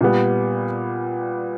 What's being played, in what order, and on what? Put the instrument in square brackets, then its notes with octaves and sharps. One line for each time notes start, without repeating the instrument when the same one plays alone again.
[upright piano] A#2 G3 B3